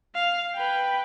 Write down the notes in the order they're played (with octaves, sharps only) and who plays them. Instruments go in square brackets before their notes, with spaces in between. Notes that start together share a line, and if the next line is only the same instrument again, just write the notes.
[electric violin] F5
B4 G5